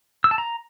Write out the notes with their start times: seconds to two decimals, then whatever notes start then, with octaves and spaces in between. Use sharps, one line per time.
0.24 E6
0.31 A5
0.38 A#5